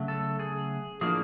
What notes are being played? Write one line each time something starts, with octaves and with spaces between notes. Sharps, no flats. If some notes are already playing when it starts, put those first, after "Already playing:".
Already playing: C#3 F#3 A3
A4
G#4
A2 F3 A#3 D4 G#4